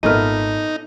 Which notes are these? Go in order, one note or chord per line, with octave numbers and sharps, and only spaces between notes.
G#1 A#2 A3 B3 D#4 D#5 F6